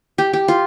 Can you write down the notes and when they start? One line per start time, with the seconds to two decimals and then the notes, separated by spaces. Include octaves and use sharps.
0.18 G4
0.33 G4
0.48 F4